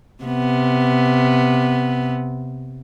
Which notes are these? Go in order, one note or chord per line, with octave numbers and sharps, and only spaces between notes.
C3 B3